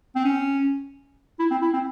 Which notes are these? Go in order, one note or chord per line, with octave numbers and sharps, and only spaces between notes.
C4
C#4
E4
C4
E4
C4